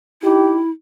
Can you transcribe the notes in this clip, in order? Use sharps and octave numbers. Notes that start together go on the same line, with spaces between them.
D#4 E4 G4